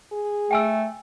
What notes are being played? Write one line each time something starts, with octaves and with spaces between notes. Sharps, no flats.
G#4
A3 G5 G#5 E6